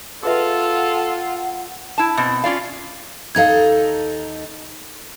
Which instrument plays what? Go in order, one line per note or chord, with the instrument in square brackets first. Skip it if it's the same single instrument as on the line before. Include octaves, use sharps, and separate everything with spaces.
[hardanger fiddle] F4 [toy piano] G#4 B4 E5 [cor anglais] A4 [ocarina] F#5
[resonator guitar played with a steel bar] E4 A5
B2 C4
C#4 F4 D5 F5
[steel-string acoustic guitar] D#2 D#4 A4 [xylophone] F5 G#6